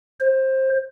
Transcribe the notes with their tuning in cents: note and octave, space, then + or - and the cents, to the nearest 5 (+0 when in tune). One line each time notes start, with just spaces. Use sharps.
C5 +20